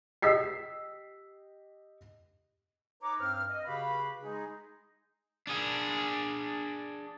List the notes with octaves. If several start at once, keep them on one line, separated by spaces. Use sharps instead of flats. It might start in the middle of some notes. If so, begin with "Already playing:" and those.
G4 D#5 E6 B6 C7
D#4 B4 C#5 A#5 D6
G2 C4 C5 F6
D#5
C#3 F#4 G4 B4 F5 B5
G#3 D#4 G#4
D4 G#4